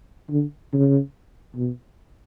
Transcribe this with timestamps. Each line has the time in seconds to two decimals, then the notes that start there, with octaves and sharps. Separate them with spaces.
0.31 D3
0.73 C#3
1.56 B2